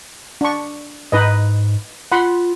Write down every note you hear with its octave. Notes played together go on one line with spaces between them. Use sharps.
D4 C#6
G#2 D#4 B4 D#5
F4 F#5 B5 C6